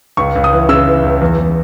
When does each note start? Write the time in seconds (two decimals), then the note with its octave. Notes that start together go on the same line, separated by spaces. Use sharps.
0.17 C#2 C#6
0.36 C#2
0.44 D#6
0.53 E3
0.69 C#3 E6
0.87 E3
1.04 C#2
1.22 E2
1.38 E2